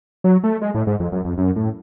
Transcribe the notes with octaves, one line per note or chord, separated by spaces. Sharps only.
F#3
A3
G#3
A2
G#2
F2
F#2
F2
F#2
A2